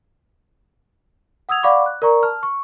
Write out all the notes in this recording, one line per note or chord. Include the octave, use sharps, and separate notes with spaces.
F#5 D#6 E6 G#6 F7
D5 F5 F#5 B5 C#6 D6
F#6
A#4 D5 A#5 C#6
A5 F6
C#6